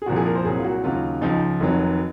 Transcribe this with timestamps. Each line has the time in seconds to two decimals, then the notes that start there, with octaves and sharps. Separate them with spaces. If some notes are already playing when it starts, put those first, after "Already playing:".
0.02 G#4
0.06 C2 A#2 F3 F#4
0.16 G#4
0.26 A#4
0.35 C5
0.45 C2 A#2 F#3 G#4
0.59 F4
0.64 F#4
0.84 D#2 C#3 F#3 F4
1.21 C#2 C#3 F3 D#4
1.60 F1 F2 D#3 F#3